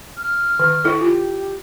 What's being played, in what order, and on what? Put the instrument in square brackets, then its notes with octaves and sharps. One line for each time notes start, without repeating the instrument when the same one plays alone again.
[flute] F6
[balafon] D#3
E4 A4
[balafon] F4 [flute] G4